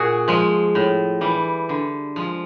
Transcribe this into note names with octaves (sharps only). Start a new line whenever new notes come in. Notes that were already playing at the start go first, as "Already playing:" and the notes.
Already playing: A#2 F#4 G#4
F3 G#3
A2
E3 G3
D3
F3 G#3